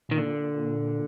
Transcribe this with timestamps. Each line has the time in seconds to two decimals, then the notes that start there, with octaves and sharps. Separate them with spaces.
0.09 A#2 D#3
0.18 D3
0.26 A#2